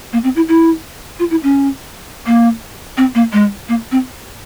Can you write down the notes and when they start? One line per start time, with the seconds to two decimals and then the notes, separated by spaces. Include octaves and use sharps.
0.13 A#3
0.24 C4
0.36 E4
0.49 E4
1.19 F4
1.31 E4
1.43 C#4
2.26 A#3
2.97 C4
3.15 A#3
3.33 G#3
3.69 A#3
3.92 C4